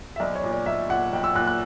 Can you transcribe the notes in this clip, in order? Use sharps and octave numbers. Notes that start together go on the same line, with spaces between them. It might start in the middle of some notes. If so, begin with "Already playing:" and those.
E5
B1 D5
C#5
A#2
D5
B1 E5
A#2 F#5
B1 G5
E6
A#2 F#6
F#6